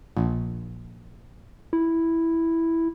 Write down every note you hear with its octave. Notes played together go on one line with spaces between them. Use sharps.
A#1
E4